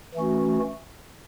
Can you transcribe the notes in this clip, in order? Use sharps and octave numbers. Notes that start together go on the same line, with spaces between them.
E3 A3 C#4 F#4